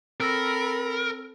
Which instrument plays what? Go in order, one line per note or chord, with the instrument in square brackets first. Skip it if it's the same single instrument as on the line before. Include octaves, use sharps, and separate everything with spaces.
[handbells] C4 E6 A#6 [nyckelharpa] A4 B5 [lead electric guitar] A#4